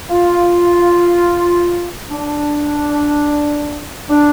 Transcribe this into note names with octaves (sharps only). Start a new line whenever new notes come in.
F4
D4
D4